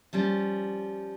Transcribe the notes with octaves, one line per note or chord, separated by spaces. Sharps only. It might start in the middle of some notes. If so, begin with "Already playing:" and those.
F3 G3 C#4